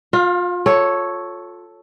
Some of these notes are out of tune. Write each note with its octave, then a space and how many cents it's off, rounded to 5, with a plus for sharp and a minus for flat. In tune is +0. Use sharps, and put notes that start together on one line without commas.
F4 +30 F5 +0
A4 +0 C#5 +0